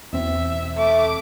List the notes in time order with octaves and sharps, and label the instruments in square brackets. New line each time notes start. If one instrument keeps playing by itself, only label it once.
[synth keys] E2 B2 C4 [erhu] E5
[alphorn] A3 [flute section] E5 [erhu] D6